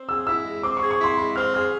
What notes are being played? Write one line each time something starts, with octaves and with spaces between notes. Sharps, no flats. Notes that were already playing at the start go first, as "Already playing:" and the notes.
Already playing: C4
G#4 E6
E4 E6
G#3
C4 D6
C#6
G#4
C#6
E4 C6
G#3 B5
C4 F6
G#4 F6